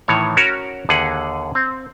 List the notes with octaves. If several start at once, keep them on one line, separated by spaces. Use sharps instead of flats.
A2 D#3 E3 C#5
C#4 F#4 A#4 C#5
D#2 D3 G#4 F#5
C4